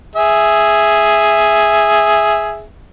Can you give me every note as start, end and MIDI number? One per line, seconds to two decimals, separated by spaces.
0.16 2.64 68
0.16 2.64 76